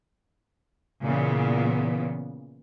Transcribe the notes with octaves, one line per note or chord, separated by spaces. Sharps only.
A#2 C#3 E3 B3